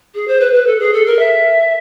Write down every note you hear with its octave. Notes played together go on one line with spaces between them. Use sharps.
G#4
C5
B4
B4
A4
G#4
A4
A#4
E5